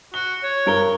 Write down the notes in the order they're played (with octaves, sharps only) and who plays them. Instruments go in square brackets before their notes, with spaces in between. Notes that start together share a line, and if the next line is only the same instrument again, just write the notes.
[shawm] F#4 [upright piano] G7
[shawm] C#5
[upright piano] G2 A#4 G7